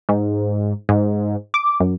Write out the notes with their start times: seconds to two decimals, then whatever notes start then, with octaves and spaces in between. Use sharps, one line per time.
0.09 G#2
0.89 G#2
1.54 D6
1.80 F#2